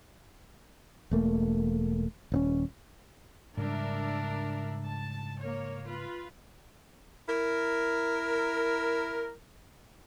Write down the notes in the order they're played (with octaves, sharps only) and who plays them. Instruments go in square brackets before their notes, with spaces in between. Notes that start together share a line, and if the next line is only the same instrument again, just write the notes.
[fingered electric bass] E1 A3 A#3
D#1 C4 C#4
[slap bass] G#2 C#3 G3 [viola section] D4 A#4 E5
[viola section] A5
A#3 C#5
F4 B4
[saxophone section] E4 A#4